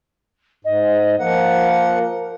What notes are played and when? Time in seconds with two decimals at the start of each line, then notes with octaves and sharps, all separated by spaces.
0.65 G#2 D#5
1.19 F3 A#3 A#4 F#5